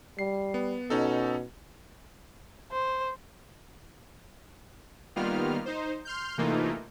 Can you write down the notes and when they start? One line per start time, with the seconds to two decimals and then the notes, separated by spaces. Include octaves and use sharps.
0.19 G3 C7
0.54 B3
0.90 B2 C#4 D#4 A4
2.72 C5
5.16 D#3 G3 A#3 B3 F4 F6
5.66 D#4 C5
6.05 C6 F6 G6
6.37 C3 E3 A3 A#3 D#4 F4